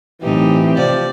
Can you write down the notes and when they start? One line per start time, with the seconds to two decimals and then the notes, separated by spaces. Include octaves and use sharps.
0.22 B1 A2 E3 C4 D#4 G4
0.77 C3 F3 D5